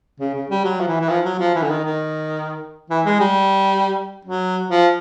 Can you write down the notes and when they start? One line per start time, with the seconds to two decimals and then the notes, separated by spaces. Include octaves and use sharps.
0.20 C#3
0.34 C#3
0.50 G3
0.65 F#3
0.80 F3
0.87 E3
1.01 E3
1.09 F3
1.25 F#3
1.40 F3
1.55 E3
1.63 D3
1.70 D#3
1.85 D#3
2.90 E3
3.06 G#3
3.20 G3
4.25 F#3
4.71 F3